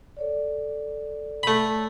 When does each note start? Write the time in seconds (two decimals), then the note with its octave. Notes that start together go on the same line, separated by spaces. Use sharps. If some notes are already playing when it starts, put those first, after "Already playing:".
0.17 A4 C#5 D5
1.43 A3 B5